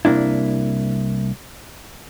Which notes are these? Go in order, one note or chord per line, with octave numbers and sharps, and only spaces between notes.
C2 G#2 A#3 D4 E4